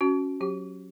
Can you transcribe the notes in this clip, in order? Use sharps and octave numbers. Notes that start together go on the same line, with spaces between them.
C#4 F#4
F#3 G4